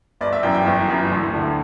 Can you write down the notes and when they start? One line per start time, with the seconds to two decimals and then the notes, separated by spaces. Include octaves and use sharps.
0.21 G1 D5
0.33 E5
0.43 F#2 E3 G5
0.54 G5
0.66 G1
0.88 F#2 E3
1.10 D2
1.33 D3